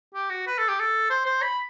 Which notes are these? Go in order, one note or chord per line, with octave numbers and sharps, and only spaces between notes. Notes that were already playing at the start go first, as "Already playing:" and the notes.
G4
F#4
B4
A4
G4
A4
C5
C5
B5